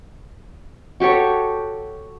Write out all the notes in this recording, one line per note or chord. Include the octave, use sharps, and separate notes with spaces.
F#4 G4 A4 C#5